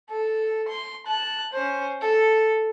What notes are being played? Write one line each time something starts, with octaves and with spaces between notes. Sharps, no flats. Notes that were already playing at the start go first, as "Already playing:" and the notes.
A4
C6
A5 F#6
C#4 C5
A4